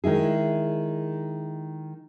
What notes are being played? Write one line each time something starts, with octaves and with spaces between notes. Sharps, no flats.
D#3 G#3 E4 G#4